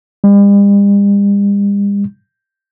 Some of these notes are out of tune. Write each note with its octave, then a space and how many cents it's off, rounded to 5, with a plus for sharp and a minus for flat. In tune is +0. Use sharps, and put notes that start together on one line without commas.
G3 +45